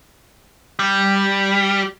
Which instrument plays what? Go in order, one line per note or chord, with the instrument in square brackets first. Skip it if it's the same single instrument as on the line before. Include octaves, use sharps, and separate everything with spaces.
[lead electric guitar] G3